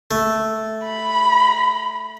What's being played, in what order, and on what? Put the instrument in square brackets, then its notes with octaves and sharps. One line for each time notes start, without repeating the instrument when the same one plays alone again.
[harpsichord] A3
[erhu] B5